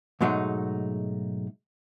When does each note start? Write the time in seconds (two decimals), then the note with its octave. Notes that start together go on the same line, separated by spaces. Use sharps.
0.21 G#2 B2 F#3 G#3 A3 D#4